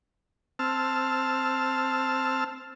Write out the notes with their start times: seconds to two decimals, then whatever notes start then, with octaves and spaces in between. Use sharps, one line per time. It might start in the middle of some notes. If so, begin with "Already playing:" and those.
0.59 C4 A5 E6 F6